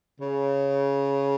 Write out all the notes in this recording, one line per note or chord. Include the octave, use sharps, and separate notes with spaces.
C#3